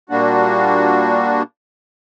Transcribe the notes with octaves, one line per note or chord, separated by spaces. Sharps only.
A#2 G3 A#3 D4 F#4